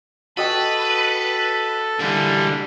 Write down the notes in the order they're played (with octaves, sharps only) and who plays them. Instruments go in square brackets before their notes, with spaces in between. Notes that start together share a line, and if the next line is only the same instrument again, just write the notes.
[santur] F#4 D#5 G5 [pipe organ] A4 [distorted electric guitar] B4
[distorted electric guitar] A#2 E3 [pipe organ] D3 G3